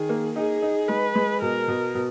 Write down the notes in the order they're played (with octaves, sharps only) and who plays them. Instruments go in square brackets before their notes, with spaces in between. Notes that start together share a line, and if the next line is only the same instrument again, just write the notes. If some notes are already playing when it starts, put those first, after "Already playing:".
Already playing: [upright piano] D#3 [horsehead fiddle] G#4
[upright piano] A#3
[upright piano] D#4 [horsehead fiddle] G#4
[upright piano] D#4
[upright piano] G#3 [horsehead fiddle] B4
[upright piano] G#3
[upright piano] B2 [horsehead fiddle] A#4
[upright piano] B2
B2